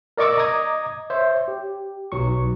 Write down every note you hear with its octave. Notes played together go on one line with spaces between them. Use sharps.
A#4 D5 D#5 C#6 D6 E6
D#5 A#5 D6 D#6 G#6
C5 C#5 E5
G4
B1 F#3 C#6